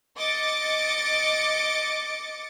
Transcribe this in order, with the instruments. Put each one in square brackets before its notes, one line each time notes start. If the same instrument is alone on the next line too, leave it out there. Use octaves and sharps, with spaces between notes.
[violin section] D#5 D6 A6 C#7 D7